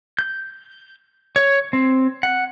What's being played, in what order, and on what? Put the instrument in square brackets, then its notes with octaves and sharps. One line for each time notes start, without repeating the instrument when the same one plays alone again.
[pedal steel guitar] G6
C#5
C4
F#5